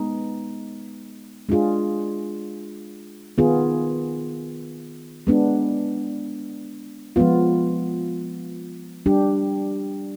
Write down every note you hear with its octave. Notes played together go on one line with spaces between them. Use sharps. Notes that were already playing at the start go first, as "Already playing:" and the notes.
Already playing: G#3 B3 D#4
G#3 D4 F4 G#4
D#3 B3 F4 G#4
G#3 B3 D4
F3 G#3 B3 F4
G3 D4 G4